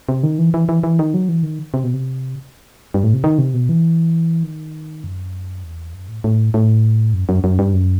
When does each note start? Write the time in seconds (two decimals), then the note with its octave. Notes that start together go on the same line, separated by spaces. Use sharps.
0.09 C3
0.23 D#3
0.39 E3
0.54 E3
0.69 E3
0.84 E3
0.99 D#3
1.14 F#3
1.29 E3
1.43 D#3
1.74 C3
1.84 B2
1.94 C3
2.94 G2
3.04 A2
3.14 C3
3.24 D#3
3.38 C3
3.54 B2
3.69 E3
4.43 D#3
5.04 F#2
5.64 E2
5.94 F#2
6.08 A2
6.24 A2
6.54 A2
7.14 F#2
7.29 F#2
7.44 F#2
7.59 G2
7.73 F#2